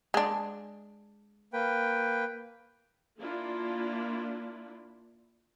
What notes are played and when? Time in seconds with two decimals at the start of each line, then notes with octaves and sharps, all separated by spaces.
0.14 G#3 D4
1.53 A#3 B4 G5
3.20 A#3 D4 E4 F4